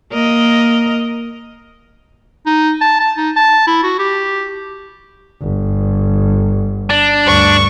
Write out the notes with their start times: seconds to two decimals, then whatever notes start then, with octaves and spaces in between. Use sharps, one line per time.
0.12 A#3 A#4 D#5
2.46 D#4
2.81 A5
3.00 A5
3.17 D#4
3.36 A5
3.67 E4
3.83 F#4
3.99 G4
5.42 G1
6.90 D4
7.26 D2 G2 C#6